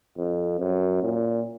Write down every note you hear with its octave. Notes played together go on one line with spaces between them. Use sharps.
F2
F#2
A#2